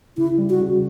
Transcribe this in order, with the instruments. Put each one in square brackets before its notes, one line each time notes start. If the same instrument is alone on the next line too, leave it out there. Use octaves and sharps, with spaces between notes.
[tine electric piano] C#3 [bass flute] E4
[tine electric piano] G3
[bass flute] F#4
[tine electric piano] C#3